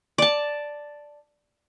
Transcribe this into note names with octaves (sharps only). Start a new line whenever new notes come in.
D5 A5